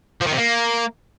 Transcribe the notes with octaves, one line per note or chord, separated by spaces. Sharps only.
F3
D#3
C3
A#3